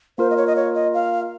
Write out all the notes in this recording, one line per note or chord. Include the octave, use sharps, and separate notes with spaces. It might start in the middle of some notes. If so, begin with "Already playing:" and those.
A#3 F4 A#4 C5
D#5
C#5
D#5
C#5
D#5
F5